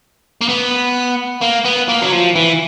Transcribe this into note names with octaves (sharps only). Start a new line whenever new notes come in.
A#3
B3
A#3
B3
A#3
F#3
F3
E3